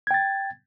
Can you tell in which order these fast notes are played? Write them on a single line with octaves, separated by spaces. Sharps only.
G#6 G5 A6